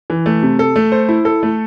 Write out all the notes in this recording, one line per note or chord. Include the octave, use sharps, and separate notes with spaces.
E3
A3
C3
A4
A3
C5
E4
A4
A3